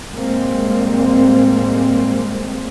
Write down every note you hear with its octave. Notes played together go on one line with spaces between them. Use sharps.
A2 G3 G#3 A#3 C4